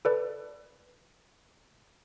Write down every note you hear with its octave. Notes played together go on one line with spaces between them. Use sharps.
A4 B4 D5